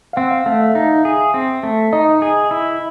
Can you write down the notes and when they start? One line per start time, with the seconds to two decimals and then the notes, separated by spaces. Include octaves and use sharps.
0.13 F5
0.17 C4 F#5
0.31 F5
0.46 A3 F5
0.60 E5
0.75 D#4
1.05 G#4
1.34 C4
1.63 A3
1.93 D#4 D#5
2.22 G#4
2.51 E4